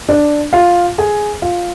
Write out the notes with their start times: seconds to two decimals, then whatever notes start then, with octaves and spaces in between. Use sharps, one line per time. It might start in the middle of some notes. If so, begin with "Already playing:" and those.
0.09 D4 D5
0.53 F4 F5
0.98 G#4 G#5
1.42 F4 F5